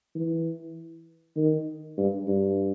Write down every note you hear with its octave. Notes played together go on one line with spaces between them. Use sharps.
E3
D#3
G2
G2